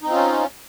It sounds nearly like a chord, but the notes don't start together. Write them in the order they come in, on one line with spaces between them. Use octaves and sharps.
D#4 C4 F4 C#4